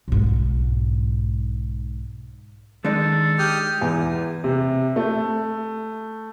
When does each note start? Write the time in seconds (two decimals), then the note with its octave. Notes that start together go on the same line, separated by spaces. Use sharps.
0.08 B1 G#2
2.85 D#3 G#3 D4 D#4 A4
3.38 G4 G5 D#6 F6 G6
3.81 E2
4.44 C3
4.96 A3